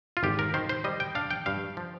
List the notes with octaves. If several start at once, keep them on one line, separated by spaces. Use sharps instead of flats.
F4
G#1 G4
A#4
D#3 C5
C5
G3 D#5
G5
D4 F5
G5
G2 F5
F3